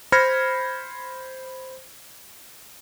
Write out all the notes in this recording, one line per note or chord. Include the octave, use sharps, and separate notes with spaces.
C5 B5 F6 G#6 A#6 C#7